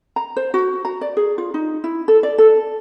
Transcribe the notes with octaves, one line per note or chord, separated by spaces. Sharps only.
A#5
C5
F#4
A#5
D5
G#4
F4
D#4
E4
A4
D5
A4